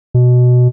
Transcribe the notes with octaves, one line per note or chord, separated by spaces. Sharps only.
B2